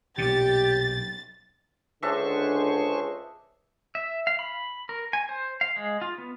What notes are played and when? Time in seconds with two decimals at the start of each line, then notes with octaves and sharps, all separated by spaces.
0.18 B1 A#2 G4 A6
2.03 C#2 D3 D4 G#4 C5 D#5 E5 C#6
3.95 E5
4.27 F5
4.39 B5
4.89 A#4
5.13 G#5
5.29 C5
5.61 F5
5.76 G#3
6.01 F4
6.18 B3